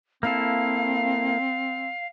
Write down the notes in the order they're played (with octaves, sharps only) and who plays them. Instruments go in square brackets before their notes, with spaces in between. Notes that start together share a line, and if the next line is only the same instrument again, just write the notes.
[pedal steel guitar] A#3 E4 A4 [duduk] C4 [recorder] F5